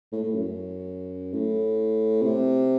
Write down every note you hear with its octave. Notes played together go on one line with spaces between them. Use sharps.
A2
A2
F#2
A2
C3